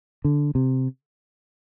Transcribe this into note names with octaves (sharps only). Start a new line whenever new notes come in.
D3
C3